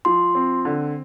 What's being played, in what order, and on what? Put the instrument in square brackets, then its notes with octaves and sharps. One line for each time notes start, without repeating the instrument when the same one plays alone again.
[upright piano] F3 [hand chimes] C6
[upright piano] C4
D3